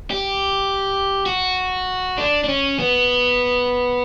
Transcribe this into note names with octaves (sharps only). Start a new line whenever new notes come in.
G4
F#4
D4
D4
C#4
B3